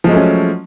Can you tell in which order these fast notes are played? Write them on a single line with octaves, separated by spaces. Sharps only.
F3 G#3 F#3 A3 C#4